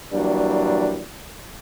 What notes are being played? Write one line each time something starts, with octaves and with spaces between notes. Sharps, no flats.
E3 F#3 G3 A#3 D4